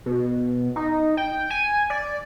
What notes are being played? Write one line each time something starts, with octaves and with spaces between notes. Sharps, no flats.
B2
D#4
G5
G#5
D5